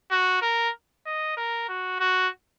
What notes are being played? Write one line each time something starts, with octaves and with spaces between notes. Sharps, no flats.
F#4
A#4
D#5
A#4
F#4
F#4